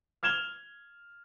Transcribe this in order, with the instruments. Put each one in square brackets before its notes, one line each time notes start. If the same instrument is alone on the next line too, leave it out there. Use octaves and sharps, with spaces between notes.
[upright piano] F6 G#6 E7 F7 G7